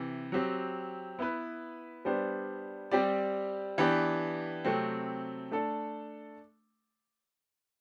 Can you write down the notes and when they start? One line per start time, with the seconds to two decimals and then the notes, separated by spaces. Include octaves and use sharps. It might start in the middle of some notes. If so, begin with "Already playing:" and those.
Already playing: C3 E3
0.32 F#3 C4 G4
1.19 B3 E4 B4
2.05 G3 B3 D4 G4 C5
2.91 G3 C4 G4 D5
3.78 E3 B3 D4 G4
4.65 C3 F#3 A3 C4
5.51 A3 D4 A4